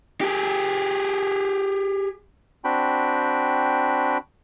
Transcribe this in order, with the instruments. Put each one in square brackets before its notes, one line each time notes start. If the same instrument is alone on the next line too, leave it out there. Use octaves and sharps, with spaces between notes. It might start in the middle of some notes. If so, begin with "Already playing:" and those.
[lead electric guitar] G4 G#4
[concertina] C4 D4 F#4 G5 B5